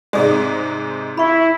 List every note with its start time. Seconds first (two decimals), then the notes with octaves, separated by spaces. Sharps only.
0.13 G#2 C3 G#3 G#4 D5
1.17 E4 B5 C#6